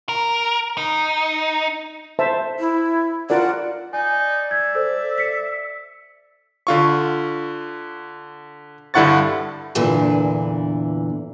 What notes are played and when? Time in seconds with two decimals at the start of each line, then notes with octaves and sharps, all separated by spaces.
0.09 A#4
0.77 D#4
2.19 C5 E5 A5
2.60 E4
3.30 F4 A#4 D5 F#5
3.93 D#4 D5 G#5
4.51 E5 G6 G#6
4.75 A4 C5 E6
5.18 B6 C#7
6.67 D3 F4 C#6
8.94 G2 D3 E4 F#5 C#6 A6
9.75 E2 A#2 D3 E3 D4